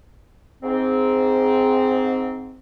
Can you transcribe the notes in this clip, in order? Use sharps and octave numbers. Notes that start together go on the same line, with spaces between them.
G#2 C4